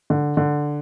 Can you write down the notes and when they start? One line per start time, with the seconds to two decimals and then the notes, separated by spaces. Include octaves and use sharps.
0.10 D3
0.37 D3